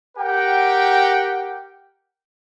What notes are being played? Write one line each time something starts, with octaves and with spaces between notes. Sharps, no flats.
G4 A#4 F#5 G5